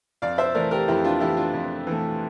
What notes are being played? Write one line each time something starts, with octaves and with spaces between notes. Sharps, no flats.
F2 D5 F5
C5 E5
E3 A3 A#4 D5
G4 A#4
F2 E4 G4
D4 F4
E3 A3 E4 G4
D4 F4
F2
E3 A3